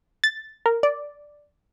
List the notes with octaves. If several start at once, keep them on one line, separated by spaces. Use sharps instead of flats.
A6
A#4
D5